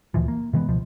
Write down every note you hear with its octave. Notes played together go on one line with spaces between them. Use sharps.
D2 A#2 E3 F3
A#3
C3 E3 G#3 B3
C#2 B2 F3